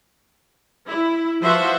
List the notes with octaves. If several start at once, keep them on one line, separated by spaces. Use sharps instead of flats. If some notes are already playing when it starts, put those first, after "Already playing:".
E4
F3 F#4 B4 C5 E5 F#5